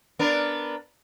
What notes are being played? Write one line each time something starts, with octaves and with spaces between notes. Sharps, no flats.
B3 D4 A#4